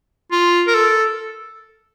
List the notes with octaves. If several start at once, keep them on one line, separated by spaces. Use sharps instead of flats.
F4
A#4
A4